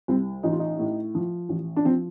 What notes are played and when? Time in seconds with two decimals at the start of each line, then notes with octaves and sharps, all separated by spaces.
0.08 C2 C4
0.43 A1 D#4
0.52 F4
0.59 D#4
0.79 A2
1.15 F3
1.49 A1
1.76 D4
1.85 F3 C4